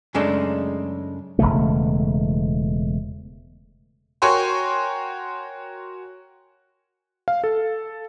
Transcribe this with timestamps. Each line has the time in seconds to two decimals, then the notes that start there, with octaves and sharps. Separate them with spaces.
0.14 F#2 C#3 G#3 A3 D4 D#4
1.39 E1 C#2 C#3 A3
4.22 F#4 A#4 C#5 G5 G#5 C6
7.28 F5
7.44 A4